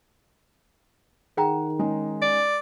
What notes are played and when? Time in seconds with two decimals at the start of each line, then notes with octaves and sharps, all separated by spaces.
1.37 D#3 G#4 F#5 G5 A#5
1.79 G#3 C#4 D#4
2.22 D5